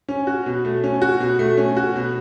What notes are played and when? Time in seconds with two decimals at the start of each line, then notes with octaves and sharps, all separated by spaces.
0.09 C#4
0.27 F#4
0.46 B2
0.65 A3
0.84 C#4
1.02 F#4
1.20 B2
1.39 A3
1.57 C#4
1.77 F#4
1.96 B2